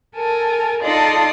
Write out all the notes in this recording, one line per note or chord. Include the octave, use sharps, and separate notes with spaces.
A4 A#4 G#5
D#4 F4 A4 D5 C6 D#6